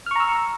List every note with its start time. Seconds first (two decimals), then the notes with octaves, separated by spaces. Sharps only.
0.06 F6
0.11 C#6
0.16 A#5
0.20 E6